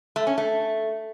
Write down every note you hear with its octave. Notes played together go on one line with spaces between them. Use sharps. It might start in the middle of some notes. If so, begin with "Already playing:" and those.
A3
C#4
A3